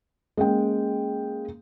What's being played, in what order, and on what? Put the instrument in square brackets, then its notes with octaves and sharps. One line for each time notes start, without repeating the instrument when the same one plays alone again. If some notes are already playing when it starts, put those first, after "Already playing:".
[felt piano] G#3 A#3 C#4 G5